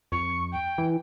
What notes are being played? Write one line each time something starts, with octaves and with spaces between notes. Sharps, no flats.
F2 C#6
G5
E3